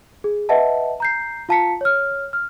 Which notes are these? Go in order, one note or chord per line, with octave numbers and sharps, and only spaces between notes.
G#4
B4 D#5 E5 F#5 A5
A#5 G6 C7
F4 F5 A5 A#5 B6 C#7
C#5 F6
F6